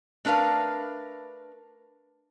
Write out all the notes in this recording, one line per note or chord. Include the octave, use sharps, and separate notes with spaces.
A3 D4 A#4 B4 F5